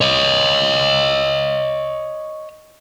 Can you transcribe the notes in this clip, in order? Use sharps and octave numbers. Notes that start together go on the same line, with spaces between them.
C#5 D#5